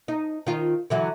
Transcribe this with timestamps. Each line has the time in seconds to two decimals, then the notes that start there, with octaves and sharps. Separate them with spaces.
0.08 D#4
0.47 D#3 F4
0.90 D3 E3 F#3